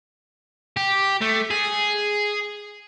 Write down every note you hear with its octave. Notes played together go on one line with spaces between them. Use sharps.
G4
A3
G#4